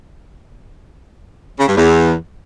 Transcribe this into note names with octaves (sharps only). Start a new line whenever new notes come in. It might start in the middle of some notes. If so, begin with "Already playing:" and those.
C#3
G2
E2